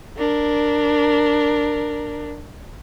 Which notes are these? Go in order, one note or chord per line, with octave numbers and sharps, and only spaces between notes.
D4 A#4